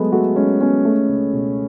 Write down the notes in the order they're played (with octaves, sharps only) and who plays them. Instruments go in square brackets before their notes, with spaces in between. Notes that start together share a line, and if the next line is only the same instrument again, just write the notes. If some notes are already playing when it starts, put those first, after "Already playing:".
Already playing: [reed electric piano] F#3 [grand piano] G#3 A3 B3
[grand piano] A3 [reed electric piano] F#4
[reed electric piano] G#3 [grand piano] C#4
[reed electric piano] B3 [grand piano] C#4
[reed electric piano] A3
C#2
B2